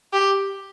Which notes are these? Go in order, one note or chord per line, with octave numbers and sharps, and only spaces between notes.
G4